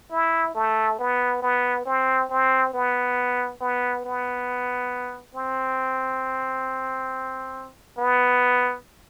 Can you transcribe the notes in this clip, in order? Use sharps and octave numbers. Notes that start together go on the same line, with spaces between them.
E4
A3
B3
B3
C4
C4
B3
B3
B3
C4
B3